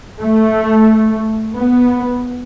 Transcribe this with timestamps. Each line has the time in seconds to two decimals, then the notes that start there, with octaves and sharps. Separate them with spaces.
0.20 A3
1.56 B3